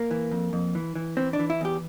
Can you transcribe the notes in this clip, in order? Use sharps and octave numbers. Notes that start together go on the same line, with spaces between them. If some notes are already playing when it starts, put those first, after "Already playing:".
Already playing: A#3
E3
F2
F2
E3
E3
E3 C4
D4
E3
E4
E2 G4